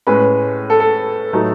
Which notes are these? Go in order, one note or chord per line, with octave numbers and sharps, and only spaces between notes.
A2 G#3 C#4 B4
A4
A4
A2 F#3 A3 D#4